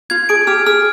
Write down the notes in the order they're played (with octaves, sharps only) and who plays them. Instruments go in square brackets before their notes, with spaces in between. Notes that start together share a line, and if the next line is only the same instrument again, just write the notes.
[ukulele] F4 [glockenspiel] G#6
[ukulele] G#4 [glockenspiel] D7
[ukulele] G4 [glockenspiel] F6
[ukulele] G#4 [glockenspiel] F6